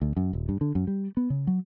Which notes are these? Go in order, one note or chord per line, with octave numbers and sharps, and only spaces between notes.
D2
F#2
D#1
G2
D3
F#2
G3
B3
C#3
F#3